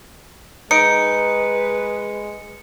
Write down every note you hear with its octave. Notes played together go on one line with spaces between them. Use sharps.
G#3 D#4 B4 C#7 D7